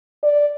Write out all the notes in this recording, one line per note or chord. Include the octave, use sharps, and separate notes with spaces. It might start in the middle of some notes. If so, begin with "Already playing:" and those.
D5